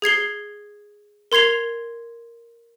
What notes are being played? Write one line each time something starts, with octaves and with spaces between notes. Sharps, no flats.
G#4 G#6 C7 G7
A#4 C6 G#6 C7 F7